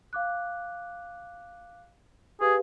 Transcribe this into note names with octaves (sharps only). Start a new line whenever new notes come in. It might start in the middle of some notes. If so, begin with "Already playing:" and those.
F5 D6 F#6
G4 G#4 B4 F5